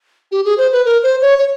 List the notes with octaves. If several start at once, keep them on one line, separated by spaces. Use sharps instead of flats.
G4
G#4
C5
B4
A#4
C5
C#5
C#5